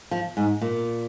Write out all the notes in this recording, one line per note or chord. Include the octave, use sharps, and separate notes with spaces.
F3
G#2
A#2